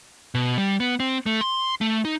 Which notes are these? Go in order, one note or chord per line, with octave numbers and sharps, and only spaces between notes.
B2
G3
B3
C4
A3
C6
A3
D#4